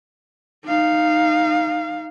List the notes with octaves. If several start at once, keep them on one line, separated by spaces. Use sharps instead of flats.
D#4 F5